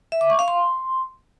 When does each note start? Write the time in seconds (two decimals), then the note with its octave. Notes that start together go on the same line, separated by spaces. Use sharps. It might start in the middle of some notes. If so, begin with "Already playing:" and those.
0.12 E5
0.21 D6
0.30 C#6
0.39 F5
0.48 C6